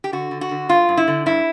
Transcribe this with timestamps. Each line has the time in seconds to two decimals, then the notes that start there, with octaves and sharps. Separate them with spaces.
0.04 G4
0.12 D3 F#4
0.31 D3
0.41 F#4
0.51 D3
0.69 G2 F4
0.89 G2
0.97 E4
1.08 D3
1.26 G2 E4